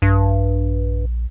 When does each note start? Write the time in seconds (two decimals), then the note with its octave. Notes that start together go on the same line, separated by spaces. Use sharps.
0.02 A#1 G2